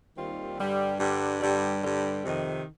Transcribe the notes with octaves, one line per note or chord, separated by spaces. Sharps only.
D#2 D#3 G3 C4 F4
G2 D3 G3
G2 D3 G3
G2 D3 G3
G2 D3 G3
F2 C3 D#3